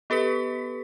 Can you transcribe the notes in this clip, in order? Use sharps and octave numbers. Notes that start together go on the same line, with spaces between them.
B3 G4 A4 B4 B6